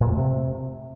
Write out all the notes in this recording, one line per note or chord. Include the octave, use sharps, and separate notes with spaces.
A#2
F2
A3
C3